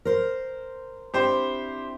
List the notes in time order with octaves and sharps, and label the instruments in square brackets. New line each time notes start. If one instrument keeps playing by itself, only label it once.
[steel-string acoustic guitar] A#4 C5
[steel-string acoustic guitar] C4 D4 E4 [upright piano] G4 C5